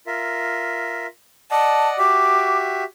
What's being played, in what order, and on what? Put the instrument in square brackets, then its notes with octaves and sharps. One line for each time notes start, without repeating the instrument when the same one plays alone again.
[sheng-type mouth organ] F4 A#4 E5
[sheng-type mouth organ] D5 D#5 F#5 [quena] A5
[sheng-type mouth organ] F#4 G4 E5 [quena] D6